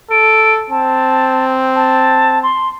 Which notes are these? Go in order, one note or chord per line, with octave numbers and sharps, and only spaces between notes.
A4 D7
C4 A5
A5
C6